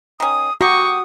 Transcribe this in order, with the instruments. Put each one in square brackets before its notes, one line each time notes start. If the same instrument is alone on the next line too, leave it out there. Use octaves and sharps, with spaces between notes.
[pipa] D#3 C#4 [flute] D#6
[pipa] A#3 G4 [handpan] F#4 [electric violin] C#6 [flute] D#6